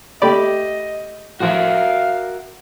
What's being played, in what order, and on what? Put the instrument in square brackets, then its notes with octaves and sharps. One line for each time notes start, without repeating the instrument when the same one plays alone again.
[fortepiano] A3 G4 B5 [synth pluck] D5 [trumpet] D#5
[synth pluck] A2 F3 [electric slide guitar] F#4 A#4 E5 [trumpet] F5